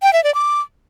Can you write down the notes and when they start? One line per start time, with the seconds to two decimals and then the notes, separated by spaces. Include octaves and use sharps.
0.03 G5
0.13 E5
0.24 D5
0.34 D6